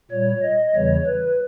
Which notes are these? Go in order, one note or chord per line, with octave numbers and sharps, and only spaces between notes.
A#2 G3 C#5
D#5
E2 C#3 E3 G3 C#5
B4